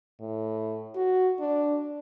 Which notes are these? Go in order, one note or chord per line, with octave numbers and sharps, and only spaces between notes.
A2
F#4
D4